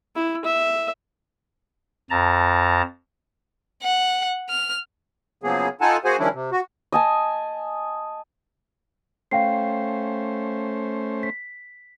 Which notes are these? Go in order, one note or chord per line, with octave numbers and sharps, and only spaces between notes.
E4
E5
F2 A5 A#5
F#5
F6
C#3 F3 F#3 A#3 B3 G#4
D#4 F4 A4 F#5 G#5 A5
A#3 F#4 G#4 C5 F#5 G#5
D#3 F3 G3 C#4 D4 E4
C3
F#4
D#5 G#5 A5
A3 C#4 C5 F5 G5 C7
B6